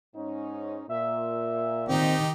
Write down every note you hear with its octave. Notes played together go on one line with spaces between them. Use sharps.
G#2 C#4 D#4
A#2 E5
D#3 C4 D#4 G4